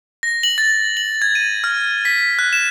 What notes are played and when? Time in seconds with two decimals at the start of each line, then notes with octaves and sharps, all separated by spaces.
0.23 A#6
0.43 F#7
0.58 A6
0.97 F#7
1.22 G#6
1.35 D#7
1.64 F6
2.05 B6
2.39 F#6
2.53 E7